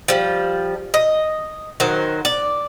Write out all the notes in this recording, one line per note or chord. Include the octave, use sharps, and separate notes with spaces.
F3 G3
D#5
D#3 F#3 C5
D5